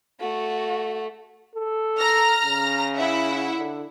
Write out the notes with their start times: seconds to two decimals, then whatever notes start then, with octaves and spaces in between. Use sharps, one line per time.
0.20 A3 F#4
1.56 A4
1.99 A#5 F6 A#6
2.46 C#3
2.96 E4 E5 F#5
3.58 D3